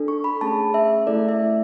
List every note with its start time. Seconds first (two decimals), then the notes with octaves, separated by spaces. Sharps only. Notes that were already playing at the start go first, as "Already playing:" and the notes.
Already playing: D4 A4
0.08 C#6
0.24 B5
0.41 A3 C#4 G#4 A5
0.74 E5
1.07 A3 E4 A4 D5
1.29 E5